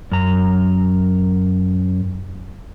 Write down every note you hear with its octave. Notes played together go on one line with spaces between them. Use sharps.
F#2 A#5